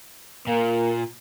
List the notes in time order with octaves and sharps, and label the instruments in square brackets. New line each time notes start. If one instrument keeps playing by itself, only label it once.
[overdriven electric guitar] A#2 [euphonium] A#3